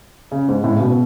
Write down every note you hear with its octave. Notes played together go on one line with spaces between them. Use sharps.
C#3
G#2
A2
C#3
B2